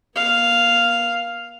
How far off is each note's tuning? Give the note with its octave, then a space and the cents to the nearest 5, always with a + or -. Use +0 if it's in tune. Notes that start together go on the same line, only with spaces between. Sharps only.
A#3 +45 F5 +0